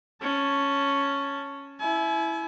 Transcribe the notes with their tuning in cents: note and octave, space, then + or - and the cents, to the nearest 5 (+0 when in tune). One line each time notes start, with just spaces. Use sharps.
C#4 +0 A5 +0
E4 +0 G#5 +45